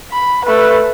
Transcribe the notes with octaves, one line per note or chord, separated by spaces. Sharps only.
B5
A3 B4